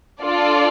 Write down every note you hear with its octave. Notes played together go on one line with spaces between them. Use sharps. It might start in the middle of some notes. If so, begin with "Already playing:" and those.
D4 F4 A4 D5